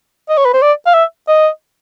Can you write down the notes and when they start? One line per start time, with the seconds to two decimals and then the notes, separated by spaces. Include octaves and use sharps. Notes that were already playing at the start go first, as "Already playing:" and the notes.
0.29 D#5
0.37 C#5
0.45 B4
0.54 C5
0.62 D5
0.86 F5
0.94 E5
1.28 D#5